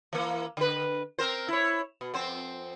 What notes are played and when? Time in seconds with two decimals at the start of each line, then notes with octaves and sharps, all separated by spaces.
0.13 E3 A#3
0.57 D3 B4
1.19 C4 A#4 C5
1.48 E4 C#5
2.01 B2
2.14 F2 C4 C5